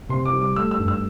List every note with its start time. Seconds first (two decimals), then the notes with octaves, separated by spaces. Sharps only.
0.09 C3 C6
0.25 D6
0.33 G3
0.41 D6
0.56 A3 E6
0.71 E6
0.79 G2
0.88 E6